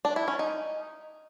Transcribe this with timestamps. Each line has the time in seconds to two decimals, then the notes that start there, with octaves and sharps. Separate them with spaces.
0.05 D4
0.16 E4
0.28 C#4
0.39 D#4